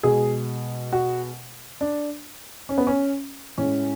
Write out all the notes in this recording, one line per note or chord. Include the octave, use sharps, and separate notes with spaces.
B2 G#3 G#4
F#4
D4
C#4
B3
C#4
A2 G#3 C#4